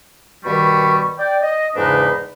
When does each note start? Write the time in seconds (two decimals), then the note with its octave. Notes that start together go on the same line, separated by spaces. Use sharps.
0.45 G2 B2 D#3 G3 B5 C#6
1.19 D5 G5
1.43 D#5
1.76 E2 G#2 C#3 D4 D#4 B4